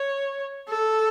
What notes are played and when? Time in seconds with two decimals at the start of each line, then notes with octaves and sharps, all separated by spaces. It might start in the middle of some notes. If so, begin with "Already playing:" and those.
Already playing: C#5
0.68 A4